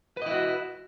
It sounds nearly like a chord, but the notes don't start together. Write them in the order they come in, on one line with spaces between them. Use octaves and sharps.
B4 D#5 E4 F#4